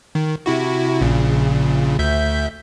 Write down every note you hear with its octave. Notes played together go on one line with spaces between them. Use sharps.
D#3
C3 E4 F#4
A#1 A#2 C#3
D2 E5 G6